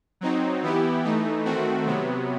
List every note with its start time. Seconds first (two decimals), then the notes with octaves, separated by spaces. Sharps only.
0.21 F#3 C4 D#4
0.63 E3 B3 E4 G4
1.04 E3 A3 D#4
1.45 D#3 A3 C4 F#4
1.86 C3 F#3 B3